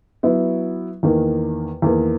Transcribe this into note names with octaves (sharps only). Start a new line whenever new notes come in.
F#3 B3 E4
E2 D#3 A#3
E2 D#3 A#3